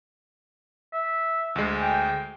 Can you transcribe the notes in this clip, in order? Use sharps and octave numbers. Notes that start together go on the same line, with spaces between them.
E5
D2 G#3
G5